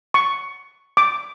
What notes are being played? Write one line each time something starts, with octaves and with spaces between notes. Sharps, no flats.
C#6
D6